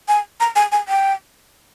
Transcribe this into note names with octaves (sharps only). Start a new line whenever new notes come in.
G#5
A#5
G#5
G#5
G5